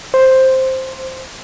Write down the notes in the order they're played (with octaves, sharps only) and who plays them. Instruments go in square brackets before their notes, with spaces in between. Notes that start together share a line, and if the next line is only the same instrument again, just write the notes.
[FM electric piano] C5